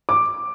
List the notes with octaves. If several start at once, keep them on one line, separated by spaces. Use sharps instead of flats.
D6